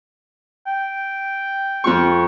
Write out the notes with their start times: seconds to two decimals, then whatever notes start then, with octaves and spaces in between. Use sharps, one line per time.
0.67 G5
1.84 F2 F4 C#6